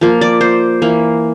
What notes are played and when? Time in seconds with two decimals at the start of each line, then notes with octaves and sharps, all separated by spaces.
0.01 F3 A#3
0.21 D5
0.41 C5
0.82 E3 A#3